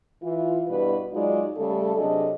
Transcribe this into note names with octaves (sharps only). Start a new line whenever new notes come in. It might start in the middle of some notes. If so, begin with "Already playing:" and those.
E3 F4
G2 B2 G3 E4 B4
F#3 G#3 D#4 F4 F#4 D5
C#3 G3 A3 A4
C3 F#3 D4 G#4 A4 D#5